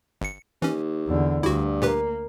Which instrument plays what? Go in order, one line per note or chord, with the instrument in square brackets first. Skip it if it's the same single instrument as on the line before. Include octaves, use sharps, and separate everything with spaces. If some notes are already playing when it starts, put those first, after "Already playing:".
[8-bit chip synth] G1 C#7
[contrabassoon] D#2 [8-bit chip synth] E3 C#4
[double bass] E2 D3
[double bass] D2 [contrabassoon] G2 [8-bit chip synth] E4 F#4
[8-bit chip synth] A#2 G4 B4 [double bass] A#3